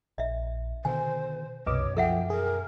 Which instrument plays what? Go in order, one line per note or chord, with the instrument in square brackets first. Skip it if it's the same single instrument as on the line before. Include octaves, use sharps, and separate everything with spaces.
[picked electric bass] A#1 [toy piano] D#5 E5
[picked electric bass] B2 D3 D#3 [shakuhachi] C5 [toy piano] G#5
[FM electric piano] C2 D#5 D6 [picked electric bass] F#2 B2 [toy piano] B4 [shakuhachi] C#5
[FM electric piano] F3 [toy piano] A4 E5 F#5 [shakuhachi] G5
[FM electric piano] G#4 [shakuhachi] A#4